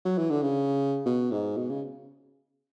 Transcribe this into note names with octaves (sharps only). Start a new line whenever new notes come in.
F#3
E3
D3
C#3
B2
G#2
B2
C#3